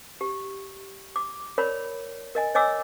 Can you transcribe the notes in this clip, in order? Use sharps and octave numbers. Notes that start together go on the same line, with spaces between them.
G4
D6
A#4 C#5 D5 B5
A#4 D#5 G#5
C#5 D#5 G#5 D6 E6